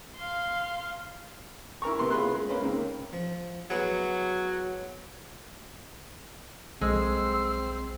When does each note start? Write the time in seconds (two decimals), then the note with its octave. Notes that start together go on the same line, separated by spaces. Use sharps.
0.16 F5 C6
1.82 E4 A#4 A#5 C#6
1.99 C3 B3 B4 C6
2.11 C#4 F4 G#4 B4 C6 F#6
2.35 G#3
2.49 A#3 C#4 B4
2.61 G#2 C#3 A#3 C4
3.13 F3
3.70 F#3 B3 E4 G#4
6.81 B1 G#3 C4 E6